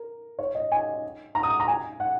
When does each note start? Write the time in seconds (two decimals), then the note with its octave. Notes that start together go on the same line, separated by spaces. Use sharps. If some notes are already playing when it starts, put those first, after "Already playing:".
Already playing: A#4
0.39 C#5
0.55 D#5
0.72 G#5
1.35 A#5
1.43 D#6
1.60 A#5
1.68 G#5
2.00 F#5